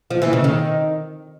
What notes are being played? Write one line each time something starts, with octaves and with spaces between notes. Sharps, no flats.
F3
E3
C#3
D#3